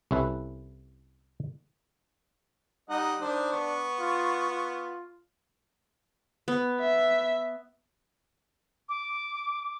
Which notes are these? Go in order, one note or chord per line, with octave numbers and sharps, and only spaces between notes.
C2 C#4 E4 A4 B4
G3 D#4 D#5 F#5
D#3 D4 C5
B3 C#6
F4
F4
B3
E5
D6